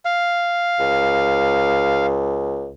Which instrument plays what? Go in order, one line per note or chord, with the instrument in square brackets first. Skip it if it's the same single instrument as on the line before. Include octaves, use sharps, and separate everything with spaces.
[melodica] F5
[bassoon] C#2